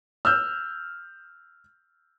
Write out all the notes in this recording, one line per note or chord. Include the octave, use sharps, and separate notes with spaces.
E6 F6 G6